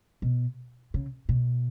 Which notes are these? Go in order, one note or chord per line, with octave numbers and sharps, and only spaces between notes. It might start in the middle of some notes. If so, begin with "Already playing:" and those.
B2
C#3
B2